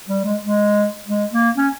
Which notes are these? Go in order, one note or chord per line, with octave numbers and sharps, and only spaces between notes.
G3
G#3
G#3
G#3
A#3
C#4